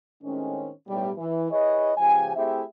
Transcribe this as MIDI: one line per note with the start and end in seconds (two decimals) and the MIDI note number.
0.24 0.71 45
0.24 0.71 51
0.24 0.71 56
0.24 0.71 60
0.24 0.71 61
0.89 1.11 35
0.89 1.11 45
0.89 1.11 55
1.18 1.47 52
1.51 1.93 64
1.51 1.93 68
1.51 1.93 71
1.51 1.93 73
1.51 1.93 75
1.98 2.33 37
1.98 2.33 49
1.98 2.33 53
1.98 2.33 67
1.98 2.33 80
2.36 2.63 57
2.36 2.63 60
2.36 2.63 64
2.36 2.63 67
2.36 2.63 68
2.36 2.63 76